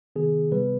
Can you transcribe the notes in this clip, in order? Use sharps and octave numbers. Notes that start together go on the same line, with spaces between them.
C3 D#3 B3 G#4
C3 G3 B3 B4